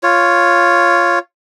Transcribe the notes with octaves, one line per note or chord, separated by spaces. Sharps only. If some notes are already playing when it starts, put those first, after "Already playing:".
F4 C#5